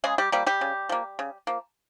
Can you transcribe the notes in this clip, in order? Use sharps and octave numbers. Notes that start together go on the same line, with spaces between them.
C#3 G#3 G#4
G3 G4
F3 G3 A#3 G4
G3 G4
C#3
F3 A#3
C#3
F3 A#3